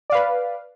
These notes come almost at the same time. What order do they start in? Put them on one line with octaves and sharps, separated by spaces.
D5 F5 B4